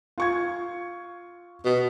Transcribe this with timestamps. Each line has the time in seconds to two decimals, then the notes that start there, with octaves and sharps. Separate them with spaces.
0.18 F4 C#6 G#6
1.65 B2